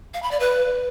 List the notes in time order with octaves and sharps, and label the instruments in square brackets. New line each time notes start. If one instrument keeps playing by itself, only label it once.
[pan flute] F5
B5
D5
B4